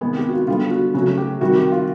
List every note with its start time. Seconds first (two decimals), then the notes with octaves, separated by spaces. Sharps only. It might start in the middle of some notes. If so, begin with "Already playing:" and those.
0.01 C3 D#3 G#3 B3 G#4
0.16 G4
0.28 F#4
0.33 F4
0.47 D3 G3 B3 F4
0.71 F#4
0.94 C#3 F#3 A3 F#4
1.18 G4
1.40 C3 D#3 G3 F#4
1.56 G4
1.72 F4